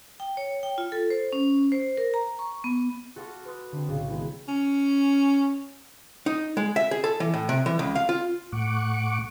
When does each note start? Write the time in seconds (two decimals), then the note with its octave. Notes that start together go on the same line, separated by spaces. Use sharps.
0.20 G5
0.37 C#5
0.63 G5
0.78 F4
0.92 A4
1.10 C5
1.33 C#4
1.72 C5
1.97 A#4
2.14 A#5
2.39 C#6
2.64 B3
3.16 F#4 A4 F#5 C6 D6 F6
3.45 B4 C6 D#6 F#6
3.72 D3 C4
3.88 B1 A2 C#3
4.10 D#3 G#3 B3 C4 E4
4.48 C#4
6.26 D#4
6.57 G#3
6.76 E5
6.91 G#4
7.04 A4
7.20 E3
7.34 A2
7.49 C3
7.66 E3
7.79 C#2
7.95 F5
8.09 F4
8.52 A2 F#5 C#6 D6